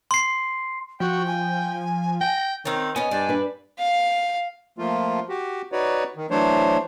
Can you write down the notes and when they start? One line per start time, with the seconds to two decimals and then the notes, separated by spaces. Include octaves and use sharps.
0.11 C6 C7
1.00 F3 F#4 G5
1.27 G#5
2.21 G5 A#6
2.65 D#3 C4 C#4
2.96 B3 C#4 D#5 G#5
3.11 G2 D5
3.29 D4 B4
3.79 F5
4.78 F3 A3 A#3 F4
5.29 F#4 G4
5.72 D#4 F#4 B4 C#5 D5
6.17 D#3
6.31 E3 F#3 A3 D4 C5 C#5